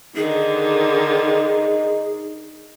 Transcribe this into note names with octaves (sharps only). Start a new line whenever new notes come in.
D3 D#3 D#4 G#4